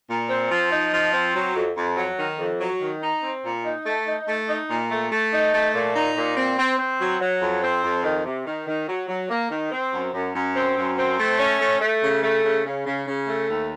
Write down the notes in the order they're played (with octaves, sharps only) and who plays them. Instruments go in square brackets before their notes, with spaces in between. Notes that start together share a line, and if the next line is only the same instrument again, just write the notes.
[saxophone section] A#2
C4
F3
D#4
F3
C4
F#3
F2
F2
F#3
D#3
F2
F#3
D#3
D#4
C4
A#2
D#4
A3
D#4
A3
D#4
A#2
A3
A3
D#4
A3
A#2
D#4
A#2
C4
C4
C4
F#3
F#3
F2
C4
F2
D#3
C3
D#3
D#3
F#3
F#3
A#3
D#3
C4
F#2
F#2
F#2
C4
F#2
C4
A3
C#4
A3
A3
C#3
A3
C#3
C#3
C#3
C#3
A3
D#2